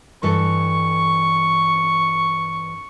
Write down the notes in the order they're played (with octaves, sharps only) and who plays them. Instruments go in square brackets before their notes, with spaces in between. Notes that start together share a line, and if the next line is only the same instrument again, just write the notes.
[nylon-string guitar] G2 E3 A4 [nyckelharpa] C#6